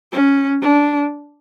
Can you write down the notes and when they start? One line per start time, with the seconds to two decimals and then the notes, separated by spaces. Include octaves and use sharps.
0.12 C#4
0.62 D4